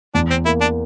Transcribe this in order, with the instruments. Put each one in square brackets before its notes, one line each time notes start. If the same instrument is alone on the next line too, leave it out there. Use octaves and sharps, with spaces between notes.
[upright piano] E2 [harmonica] D4
[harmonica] C4
[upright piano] A#3 [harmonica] E4
[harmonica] D4